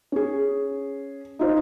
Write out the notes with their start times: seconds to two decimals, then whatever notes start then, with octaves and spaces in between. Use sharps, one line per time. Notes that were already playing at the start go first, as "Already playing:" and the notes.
0.12 C#4 G#4
1.39 D#4 F4 C5